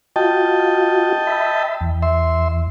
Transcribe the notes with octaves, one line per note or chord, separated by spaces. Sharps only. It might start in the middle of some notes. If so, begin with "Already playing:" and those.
F4 F#4 D#5 G5 A5
E5 B5
E2
E5 C6